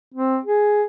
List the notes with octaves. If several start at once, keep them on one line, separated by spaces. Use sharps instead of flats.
C4
G#4